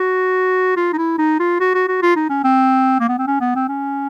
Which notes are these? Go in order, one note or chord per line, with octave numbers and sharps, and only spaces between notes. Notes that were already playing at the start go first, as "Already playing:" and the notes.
Already playing: F#4
F4
D#4
E4
D#4
F4
F#4
F#4
F#4
F4
D#4
C#4
C4
A#3
B3
C4
C#4
B3
C4
C#4